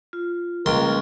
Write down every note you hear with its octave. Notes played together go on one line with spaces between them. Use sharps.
F4
C#2 G3 A#3 A#4 C6